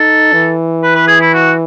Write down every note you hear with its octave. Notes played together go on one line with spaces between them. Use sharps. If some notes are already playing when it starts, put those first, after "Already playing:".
Already playing: D#4 A4
E3
B4
B4
G#4
E4
F#4